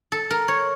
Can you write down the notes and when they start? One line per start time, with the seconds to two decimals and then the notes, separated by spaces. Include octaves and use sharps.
0.12 A4
0.30 A#4
0.48 C#5